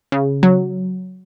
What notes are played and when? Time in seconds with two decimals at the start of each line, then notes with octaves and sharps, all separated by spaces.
0.12 C#3
0.43 F#3